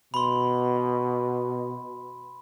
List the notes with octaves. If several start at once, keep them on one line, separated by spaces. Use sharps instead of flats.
B2 B5 C6